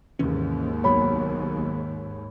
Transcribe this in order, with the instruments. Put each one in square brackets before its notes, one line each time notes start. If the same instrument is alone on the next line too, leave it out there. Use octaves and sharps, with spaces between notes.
[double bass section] D#2 G#2 [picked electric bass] C3 E3 C#4
[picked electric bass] C2 F#3 B3 [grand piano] C#5 B5